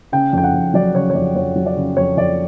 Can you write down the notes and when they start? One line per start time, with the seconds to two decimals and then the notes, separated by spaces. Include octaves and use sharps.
0.12 C#3 G5
0.33 F2 G5
0.44 F#5
0.54 F2
0.74 F#3 D5
0.94 C#3 C#5
1.10 C#5
1.15 F2 D5
1.36 F2 C#5
1.56 F#3
1.66 D5
1.76 C#3
1.97 F2 C#5
2.17 F2 D5